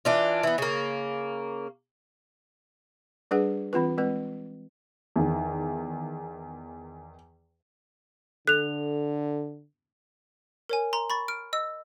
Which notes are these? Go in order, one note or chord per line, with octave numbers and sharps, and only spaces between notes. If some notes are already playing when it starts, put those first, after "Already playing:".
E3 D4 F4
E3 B3
C#3 A#3
G3 D4 G#4 B4 F#5
E3 C4 F4 B4
G#3 C4 B4
E2 D#3
D3 A4 F#6 F7
A#4 C#5 G#5
A#5 C6
B5 C#6 A6
F6 D7
D#5 E6